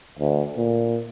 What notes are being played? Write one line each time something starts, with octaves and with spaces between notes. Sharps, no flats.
D2
A#2